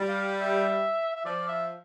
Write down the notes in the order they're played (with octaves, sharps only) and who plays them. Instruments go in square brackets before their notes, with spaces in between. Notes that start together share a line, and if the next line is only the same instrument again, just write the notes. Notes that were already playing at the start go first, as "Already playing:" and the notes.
Already playing: [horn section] G3
[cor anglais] F5
E5
E5
[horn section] F3 [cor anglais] D5
[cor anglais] E5